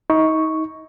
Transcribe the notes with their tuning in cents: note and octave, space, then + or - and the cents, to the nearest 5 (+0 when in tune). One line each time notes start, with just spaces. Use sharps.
D#4 +30 C#6 +0